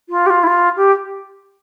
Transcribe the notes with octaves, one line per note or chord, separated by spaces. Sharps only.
F4
G4
F4
E4
F4
G4